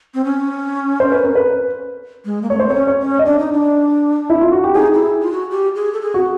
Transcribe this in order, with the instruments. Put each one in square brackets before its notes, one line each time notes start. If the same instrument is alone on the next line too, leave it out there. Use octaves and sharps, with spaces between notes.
[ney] C4
C#4
[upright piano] C5
B4
A#4
B4
[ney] G#3
A#3
[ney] A3 [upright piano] C#5
[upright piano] C5
[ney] C4 [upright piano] C#5
[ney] C#4
[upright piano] C#5
[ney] C#4
[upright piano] D#5
[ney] D4 [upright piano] D5
[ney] D#4
D4
[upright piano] E4
F4
F#4
G4
[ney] D#4 [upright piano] G#4
[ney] E4
F4
F#4
G4
G#4
A4
G#4
[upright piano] F#4